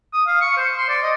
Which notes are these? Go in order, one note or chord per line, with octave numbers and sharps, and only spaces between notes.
D#6
F5
C#6
C5
C6
D5
D#5